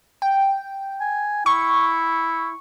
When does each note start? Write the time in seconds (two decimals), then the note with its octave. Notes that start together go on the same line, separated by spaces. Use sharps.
0.22 G5
1.01 G#5
1.46 E4 C#6